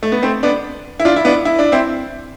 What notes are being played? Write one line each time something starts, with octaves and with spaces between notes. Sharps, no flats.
A3
B3
A3 C4
B3 D4
E4
D4 F4
E4
B3 D4
E4
D4
C4 E4